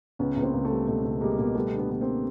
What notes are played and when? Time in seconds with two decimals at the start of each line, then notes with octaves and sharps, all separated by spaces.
0.19 C#2 B3 C#4
0.36 C#2
0.42 A#3 C4
0.54 C#2
0.65 A3
0.71 G3
0.87 B2 A3
1.04 C#2
1.21 G3 G#3 A#3
1.38 B2 G#3 A#3
1.55 G3 A3 B3
1.73 D3
1.78 A3 B3
1.90 D3 B3
2.01 A#3 C4
2.07 G3